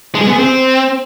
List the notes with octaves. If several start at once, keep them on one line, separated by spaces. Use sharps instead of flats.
G#3
G#4
B3
G#4
C4